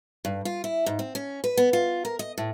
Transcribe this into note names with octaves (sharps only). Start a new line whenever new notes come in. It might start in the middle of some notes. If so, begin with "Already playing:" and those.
G2
F4
E4
G#2
C4
C#4
B4
B3
F4
A#4
D#5
A2